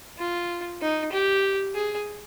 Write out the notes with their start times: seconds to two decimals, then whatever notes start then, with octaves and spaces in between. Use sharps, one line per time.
0.18 F4
0.81 D#4
1.12 G4
1.75 G#4